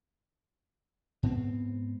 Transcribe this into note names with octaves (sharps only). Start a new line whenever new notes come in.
G#2 B3 C4